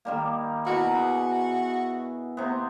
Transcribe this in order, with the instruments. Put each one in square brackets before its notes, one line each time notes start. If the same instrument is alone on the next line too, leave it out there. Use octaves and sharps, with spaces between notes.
[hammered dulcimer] D#3 G3 A#3
[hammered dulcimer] B2 E4 A#4 [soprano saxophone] F#4
[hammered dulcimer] G#4 B4
C3 B3